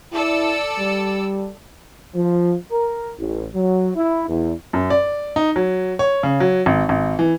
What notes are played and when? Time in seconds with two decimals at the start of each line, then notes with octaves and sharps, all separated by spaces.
0.13 E4 A4 D5 E6
0.79 G3
2.15 F3
2.71 A#4
3.17 A1
3.55 F#3
3.96 E4
4.29 E2
4.73 F#2
4.90 D5
5.36 D#4
5.56 F#3
5.99 C#5
6.23 C#3
6.40 F#3
6.66 G#1
6.89 G#1
7.19 E3